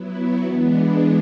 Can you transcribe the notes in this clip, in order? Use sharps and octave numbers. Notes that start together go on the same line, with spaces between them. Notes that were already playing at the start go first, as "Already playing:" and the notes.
Already playing: F#3 B3 E4
E3 G#3 B3 D4